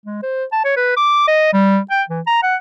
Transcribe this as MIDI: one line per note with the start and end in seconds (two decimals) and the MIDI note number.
0.06 0.19 56
0.22 0.44 72
0.52 0.64 81
0.65 0.76 73
0.77 0.95 71
0.97 1.24 86
1.28 1.50 75
1.53 1.79 55
1.91 2.03 79
2.09 2.21 52
2.27 2.42 82
2.43 2.56 78